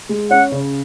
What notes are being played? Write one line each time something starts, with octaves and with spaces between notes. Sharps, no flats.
G#3
C#4 F#5
C#3